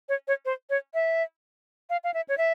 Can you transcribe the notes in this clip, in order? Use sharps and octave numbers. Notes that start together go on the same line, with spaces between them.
C#5
C#5
C5
C#5
E5
F5
F5
E5
C#5
E5